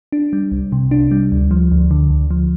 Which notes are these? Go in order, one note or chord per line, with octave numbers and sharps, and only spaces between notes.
D4
G3
C2
C3
D4
G3
D2
F3
D2
D3
D2
F3